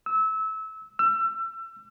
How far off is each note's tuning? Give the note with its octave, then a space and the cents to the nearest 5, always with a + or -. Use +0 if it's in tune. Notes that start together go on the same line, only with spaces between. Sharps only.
E6 -25
E6 +30